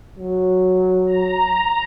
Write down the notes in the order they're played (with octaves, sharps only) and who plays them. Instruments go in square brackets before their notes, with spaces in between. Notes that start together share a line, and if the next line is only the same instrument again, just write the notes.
[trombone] F#3
[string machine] A#5